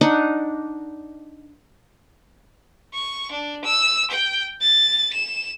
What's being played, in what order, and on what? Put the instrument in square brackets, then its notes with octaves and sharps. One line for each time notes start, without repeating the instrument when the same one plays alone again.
[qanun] D4 D#4 F#5
[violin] C#6
D4
E6
G5
A6
E7